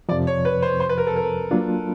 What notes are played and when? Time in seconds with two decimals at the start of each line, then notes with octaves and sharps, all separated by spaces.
0.09 F2 C3 F3 D5
0.27 C#5
0.45 B4
0.62 C5
0.80 C5
0.89 B4
0.98 A#4
1.07 A4
1.16 A#4
1.51 F#3 A#3 D4 F4